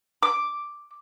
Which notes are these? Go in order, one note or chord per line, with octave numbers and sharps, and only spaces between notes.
D6